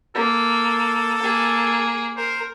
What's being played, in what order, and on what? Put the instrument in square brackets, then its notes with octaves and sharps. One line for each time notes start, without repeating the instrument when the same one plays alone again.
[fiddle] A#3 [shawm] A4
[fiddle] A#3 G#4
[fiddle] A#4 [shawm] C5